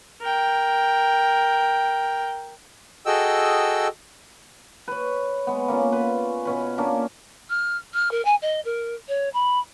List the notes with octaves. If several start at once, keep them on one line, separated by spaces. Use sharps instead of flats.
A#4 G5
F#4 G#4 A4 D#5 G5 E6
B4 C#5
G#3 B3
A#3 C#4 F4 D5
B4
B2 C#4 B4
A#3 C#4 D4
F6
F6
A#4
G#5
D#5
A#4
C#5
B5